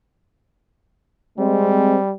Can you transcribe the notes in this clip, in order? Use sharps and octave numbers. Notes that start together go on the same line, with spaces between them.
G3 G#3 C4